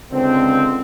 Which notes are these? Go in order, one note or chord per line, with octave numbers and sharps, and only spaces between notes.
C#2 D3 C4